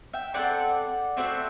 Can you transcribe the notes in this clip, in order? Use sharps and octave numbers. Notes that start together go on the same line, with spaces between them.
E5 G5
C4 E4 A4 D5 F#5
A3 C4 F#4 C5 E5